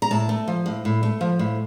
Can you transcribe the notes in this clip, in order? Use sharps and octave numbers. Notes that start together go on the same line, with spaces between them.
A#5
A2 A5
A3
F3
A2
A2
A3
F3
A2